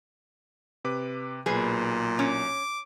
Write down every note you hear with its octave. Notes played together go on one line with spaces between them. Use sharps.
C3 B4 D6
B1 A#2 G#4 B4 C7
C#4 D6